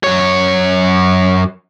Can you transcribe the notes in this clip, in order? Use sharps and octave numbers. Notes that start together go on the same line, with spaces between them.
F#2 C#5